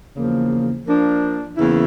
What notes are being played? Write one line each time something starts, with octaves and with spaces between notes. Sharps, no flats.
E2 C#3 F3 A#3
F3 A#3 D4
E2 C#3 E3 A#3 E4